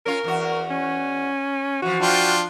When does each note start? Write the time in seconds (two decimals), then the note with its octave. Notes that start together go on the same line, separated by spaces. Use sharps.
0.06 C#4 F4 A#4
0.24 E2 F#4
0.70 C#4
1.82 E3 F3 F#4
2.00 F3 D4 F4 G5